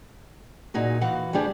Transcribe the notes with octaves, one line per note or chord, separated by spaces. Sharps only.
A#2 D#4 F#4 G#4
E3 F#4 F5 F#5
D2 G3 D4 G4 G#4